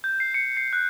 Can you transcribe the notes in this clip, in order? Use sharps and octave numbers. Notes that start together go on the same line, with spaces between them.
G6
C7
C#7
C7
F#6